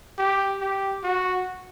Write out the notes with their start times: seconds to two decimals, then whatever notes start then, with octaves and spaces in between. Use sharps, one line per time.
0.18 G4
0.61 G4
1.04 F#4